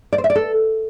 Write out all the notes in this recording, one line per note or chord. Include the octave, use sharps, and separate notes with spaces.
D5
C5
E5
D5
A4